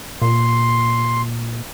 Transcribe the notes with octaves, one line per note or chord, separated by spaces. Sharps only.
A#2 C6